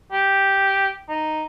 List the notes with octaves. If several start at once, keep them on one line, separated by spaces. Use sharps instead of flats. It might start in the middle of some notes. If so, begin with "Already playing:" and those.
G4
D#4